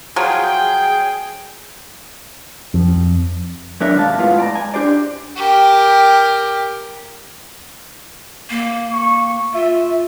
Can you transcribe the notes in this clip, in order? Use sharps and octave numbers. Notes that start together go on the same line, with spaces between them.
F3 F#3 F4 G#4 G5
F2
F#3 B3 D4 A#4 C#5 E5
D#2 G#2 C3 G3 F5 A5
A2 G#3 B3 F4 F5
D5 A5 A#5
G#5
D4 G4 C5 D5
G4 A#4
A#3
C#6
F4 E5